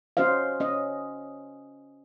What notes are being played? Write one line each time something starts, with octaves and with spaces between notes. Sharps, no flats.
C#4 F#4 C5 D#5 F5
C#4 D#5